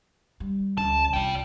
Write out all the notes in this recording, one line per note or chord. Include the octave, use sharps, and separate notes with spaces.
G3
C#2 A5
C2 F4 D5 G5